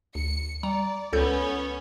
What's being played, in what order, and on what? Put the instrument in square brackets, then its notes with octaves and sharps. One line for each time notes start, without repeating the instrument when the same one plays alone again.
[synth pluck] D2 [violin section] C#7
[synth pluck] G3 A#5 [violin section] D5
[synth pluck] C#2 A4 G6 [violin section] B3 C#4 C#5